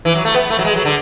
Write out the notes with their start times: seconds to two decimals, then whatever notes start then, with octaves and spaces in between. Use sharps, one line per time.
0.05 E3
0.15 F#3
0.25 A3
0.35 B3
0.50 A3
0.59 F#3
0.64 G#3
0.75 F#3
0.85 D3